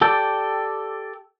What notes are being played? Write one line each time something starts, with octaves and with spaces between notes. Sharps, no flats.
G4 A4 D5 G5